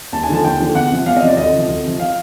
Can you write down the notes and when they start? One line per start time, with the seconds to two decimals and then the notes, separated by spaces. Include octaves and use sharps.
0.13 D#2 A5
0.23 G#5
0.29 D3 F3 A5
0.44 D#2 G5
0.60 D3 F3
0.75 E2 F#5
0.91 C3 F3
1.06 E2 F5
1.16 D#5
1.22 C3 F3 D5
1.37 D2 D#5
1.53 C3 F3
1.68 D2
1.84 C3 F3
2.00 F5